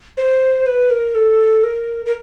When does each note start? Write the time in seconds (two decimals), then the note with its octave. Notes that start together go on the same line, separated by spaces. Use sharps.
0.17 C5
0.66 B4
0.90 A#4
1.15 A4
1.63 A#4
2.06 A#4